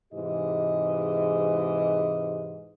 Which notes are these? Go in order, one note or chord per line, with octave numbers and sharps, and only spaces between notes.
G#2 C3 E3 G#3 G4 D#5